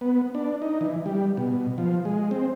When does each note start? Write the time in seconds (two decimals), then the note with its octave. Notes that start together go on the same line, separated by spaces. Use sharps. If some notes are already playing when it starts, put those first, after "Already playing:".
0.01 B3
0.35 D4
0.62 D#4
0.81 E3
1.06 G3
1.37 B2
1.78 F3
2.05 G#3
2.31 C4